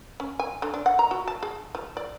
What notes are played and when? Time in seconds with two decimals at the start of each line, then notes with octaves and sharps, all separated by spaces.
0.20 C#4
0.39 G#5
0.62 D3
0.74 D4
0.86 F#5
0.99 A#5
1.11 F#4
1.28 A5
1.43 G#4
1.75 F3
1.97 D5